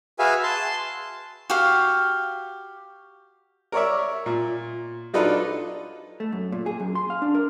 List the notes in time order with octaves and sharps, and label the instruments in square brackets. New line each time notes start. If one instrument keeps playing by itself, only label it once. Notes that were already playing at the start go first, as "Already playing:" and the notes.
[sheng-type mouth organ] F#4 G#4 B4 E5 F5 G#5
A5 C6
[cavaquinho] F#4 G4 F5
[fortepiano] A#4 C#5 D5 E5
A#2
F#3 D4 D#4 F4 A4 B4
[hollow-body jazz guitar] A3
F#2
A#2
G#4
F#2
C6
F5
D4
A#4